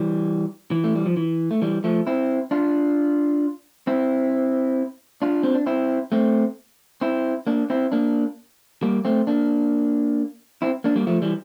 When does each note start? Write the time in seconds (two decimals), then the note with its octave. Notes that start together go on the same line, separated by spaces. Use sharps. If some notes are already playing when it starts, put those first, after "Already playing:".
Already playing: E3 G3
0.71 E3
0.84 A3
0.95 G3
1.06 F3
1.17 E3
1.51 A3
1.62 E3 G3
1.84 F3 A3
2.07 C4 E4
2.51 D4 F4
3.87 C4 E4
5.22 D4 F4
5.43 C4
5.54 D4
5.66 C4 E4
6.12 A3 C4
7.01 C4 E4
7.47 A#3 D4
7.70 C4 E4
7.92 A#3 D4
8.82 G3 A#3
9.05 A3 C4
9.27 A#3 D4
10.62 C4 E4
10.84 A#3 D4
10.96 G3 A#3
11.07 F3 A3
11.22 E3 G3